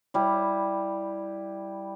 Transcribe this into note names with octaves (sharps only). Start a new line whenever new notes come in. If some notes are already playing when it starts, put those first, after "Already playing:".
G3 E4